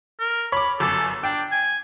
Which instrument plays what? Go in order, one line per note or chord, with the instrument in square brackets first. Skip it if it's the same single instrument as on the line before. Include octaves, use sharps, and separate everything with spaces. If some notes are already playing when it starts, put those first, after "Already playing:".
[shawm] A#4
[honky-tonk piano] C#5 D6 [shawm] B5
[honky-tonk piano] G1 F#2 D6 [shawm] A4
[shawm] D4 [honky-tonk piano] G5
[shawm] G#5